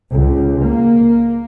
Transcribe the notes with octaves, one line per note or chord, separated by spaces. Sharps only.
C#2
A#3